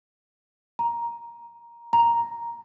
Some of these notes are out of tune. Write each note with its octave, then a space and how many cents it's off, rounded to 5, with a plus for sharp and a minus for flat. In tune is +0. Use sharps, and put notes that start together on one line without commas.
A#5 +10
A#5 +5